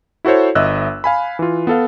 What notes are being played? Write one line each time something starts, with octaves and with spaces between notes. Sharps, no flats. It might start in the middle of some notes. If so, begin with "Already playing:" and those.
E4 F#4 A4 C5 C#5
G1 D#5 E5 E6 F#6
F5 G#5 B5
E3 F4
B3 A4 F5